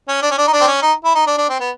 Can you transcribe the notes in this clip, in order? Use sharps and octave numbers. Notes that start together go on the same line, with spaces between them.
C#4
D4
C#4
D4
D#4
D4
C4
C#4
D#4
E4
D#4
D4
D4
C4
B3